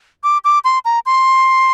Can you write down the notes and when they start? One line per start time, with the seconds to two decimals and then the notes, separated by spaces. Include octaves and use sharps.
0.24 D6
0.45 D6
0.64 C6
0.85 A#5
1.06 C6